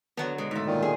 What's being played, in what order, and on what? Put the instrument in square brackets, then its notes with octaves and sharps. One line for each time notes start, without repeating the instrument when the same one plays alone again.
[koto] D3 F#3 [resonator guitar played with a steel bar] B3
[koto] B2 [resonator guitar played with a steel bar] G#3
[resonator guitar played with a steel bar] G#2 A3
[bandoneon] A#2 D#3
[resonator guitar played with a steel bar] G#4